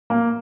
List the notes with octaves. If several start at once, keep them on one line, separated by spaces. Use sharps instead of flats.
A#3